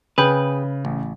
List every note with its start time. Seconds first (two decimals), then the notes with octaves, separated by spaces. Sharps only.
0.18 C#3 G#4 B4 G5
0.85 A1